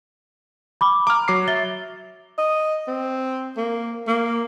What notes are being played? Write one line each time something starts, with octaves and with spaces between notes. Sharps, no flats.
B5 D6
A#5 D6 F6
F#3 D6 C7
E5 A6 G7
D#5
C4
A#3
A#3